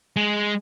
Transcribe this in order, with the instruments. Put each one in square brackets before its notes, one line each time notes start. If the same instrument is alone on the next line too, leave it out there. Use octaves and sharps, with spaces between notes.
[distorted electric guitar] G#3